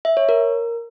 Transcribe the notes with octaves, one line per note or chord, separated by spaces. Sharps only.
E5
C#5
A#4